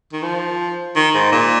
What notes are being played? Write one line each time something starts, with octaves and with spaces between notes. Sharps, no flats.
D#3
F3
D#3
G#2
A#2